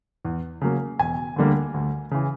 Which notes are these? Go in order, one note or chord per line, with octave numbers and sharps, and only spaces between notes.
E2
C#3 F#3 A#3
E1 G#5
D2 D3 G3 A#3
D2
C#3 E3